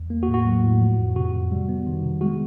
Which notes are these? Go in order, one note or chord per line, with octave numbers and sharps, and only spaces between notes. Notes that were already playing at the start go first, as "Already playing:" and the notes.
Already playing: E2
A#3
F#4
A2
F#4
F#3
A2
F3
F2
C3 F#4
F2
G3
B3
D#3
C3
G#3 F#4